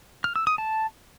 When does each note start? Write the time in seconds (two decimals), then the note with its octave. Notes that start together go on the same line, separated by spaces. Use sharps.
0.24 F6
0.36 E6
0.47 D#6
0.58 A5